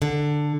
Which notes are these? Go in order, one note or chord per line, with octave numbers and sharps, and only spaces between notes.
D3